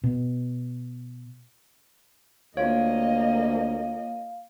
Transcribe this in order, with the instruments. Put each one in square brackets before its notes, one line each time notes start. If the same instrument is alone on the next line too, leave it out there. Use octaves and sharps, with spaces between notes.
[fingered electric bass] B2
[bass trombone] D2 [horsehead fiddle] A#3 D#5 [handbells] F4 C#5 [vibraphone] F5